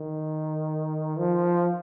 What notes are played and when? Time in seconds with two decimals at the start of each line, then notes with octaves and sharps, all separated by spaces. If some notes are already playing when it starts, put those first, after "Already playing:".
Already playing: D#3
1.18 F3